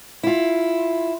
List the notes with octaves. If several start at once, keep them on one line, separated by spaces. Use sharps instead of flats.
E4 F4